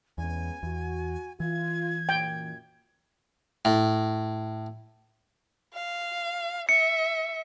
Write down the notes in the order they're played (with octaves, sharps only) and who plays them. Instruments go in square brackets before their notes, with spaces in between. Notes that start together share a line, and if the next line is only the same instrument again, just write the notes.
[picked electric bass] E2 [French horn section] G#3 B3 C#4 [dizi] G#5
[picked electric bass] E2 [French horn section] F#4
[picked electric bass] E3 [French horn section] F4 [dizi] G#6
[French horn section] F#2 A#2 [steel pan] G5
[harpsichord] A2
[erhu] F5
[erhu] E5 [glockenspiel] C#7